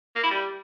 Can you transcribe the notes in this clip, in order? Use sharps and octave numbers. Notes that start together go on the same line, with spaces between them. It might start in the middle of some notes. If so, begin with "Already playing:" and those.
A#3
E4
G3